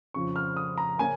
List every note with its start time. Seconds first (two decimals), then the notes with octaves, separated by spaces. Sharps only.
0.14 F2 C#3 F3 C#6
0.36 F6
0.57 D#6
0.78 A#5
0.99 C#3 A#3 C#4 G#5